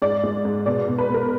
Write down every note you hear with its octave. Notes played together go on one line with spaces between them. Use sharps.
G#2 D5
G#3
G#2
B2 D5
B2
B4
B2
A#4